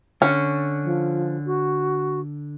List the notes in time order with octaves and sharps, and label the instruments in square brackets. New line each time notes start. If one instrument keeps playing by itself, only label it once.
[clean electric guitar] D3 [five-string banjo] C#4
[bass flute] F3
F#4